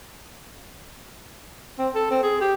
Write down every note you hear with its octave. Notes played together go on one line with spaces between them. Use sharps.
C4
A4
C4
G#4
G4